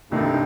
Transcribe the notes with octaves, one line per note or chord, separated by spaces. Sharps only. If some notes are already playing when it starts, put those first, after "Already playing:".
C2 G2 C3 D#3 A3 D#4